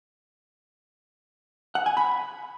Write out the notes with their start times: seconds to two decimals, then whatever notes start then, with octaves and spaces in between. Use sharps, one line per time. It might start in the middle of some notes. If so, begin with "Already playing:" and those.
1.75 F#5
1.86 G#5
1.97 B5